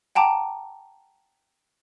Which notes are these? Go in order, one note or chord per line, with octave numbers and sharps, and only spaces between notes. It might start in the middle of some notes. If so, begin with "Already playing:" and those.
F#5 G5 A5 A#5 D6